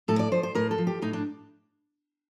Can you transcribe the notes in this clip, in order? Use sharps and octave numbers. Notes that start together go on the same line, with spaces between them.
A2 A4
D5
F3 C5
C5
A2 A#4
A4
F3
G4
A2 D#4
D4